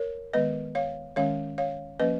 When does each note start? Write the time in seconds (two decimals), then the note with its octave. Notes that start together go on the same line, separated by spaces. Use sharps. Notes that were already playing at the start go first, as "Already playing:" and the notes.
Already playing: A#4 C#5
0.33 D#3 G#3 B3 B4 D#5
0.75 C#5 F5
1.16 D#3 G#3 C#4 C#5 F5
1.58 C#5 F5
2.00 F3 A#3 C#4 B4 D#5